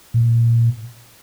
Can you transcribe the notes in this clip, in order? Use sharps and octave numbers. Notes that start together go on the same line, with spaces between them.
A#2